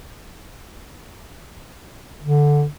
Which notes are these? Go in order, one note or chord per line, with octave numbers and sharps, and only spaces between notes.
D3